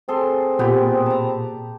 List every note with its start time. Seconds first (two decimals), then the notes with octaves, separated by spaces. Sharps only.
0.08 C4 G#4 A4 C6
0.59 A#2 B3 G4 G#4
1.06 A5 A#5